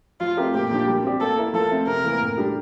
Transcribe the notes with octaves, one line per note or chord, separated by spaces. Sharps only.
F3 F4
A3 C4 G4 A#4
A#2 G4
F3 A#3 D4
G3
C4 G4 D5
A#3 A4
E4 A#4
F3 A4
A3 C4
C3 A#4
E3 A#3
A2
G3 D4 G4